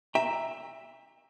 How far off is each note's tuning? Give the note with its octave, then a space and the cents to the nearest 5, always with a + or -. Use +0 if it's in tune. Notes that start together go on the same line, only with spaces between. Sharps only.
E5 +0 G5 +40 A#5 +0